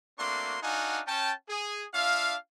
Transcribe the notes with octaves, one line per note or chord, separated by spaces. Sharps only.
A3 A#3 C4 D4 F#4 C6
D4 D#4 F#4 F5 F#5 G#5
C#4 G5 A5
G#4
D4 F4 E5 F5